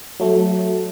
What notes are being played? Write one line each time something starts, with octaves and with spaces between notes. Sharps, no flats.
F#3 A3